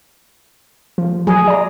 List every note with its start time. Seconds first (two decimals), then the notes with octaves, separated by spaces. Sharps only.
0.98 F3
1.27 F#3 G#4
1.48 D5 A#5